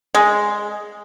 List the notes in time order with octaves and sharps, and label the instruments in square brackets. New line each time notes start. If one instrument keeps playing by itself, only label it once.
[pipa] G#3